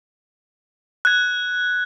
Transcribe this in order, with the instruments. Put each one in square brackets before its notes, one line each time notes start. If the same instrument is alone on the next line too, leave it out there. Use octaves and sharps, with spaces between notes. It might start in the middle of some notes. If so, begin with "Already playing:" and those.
[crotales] F#6 G#6